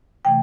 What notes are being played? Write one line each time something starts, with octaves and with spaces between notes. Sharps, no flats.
C3 E3 A3 G5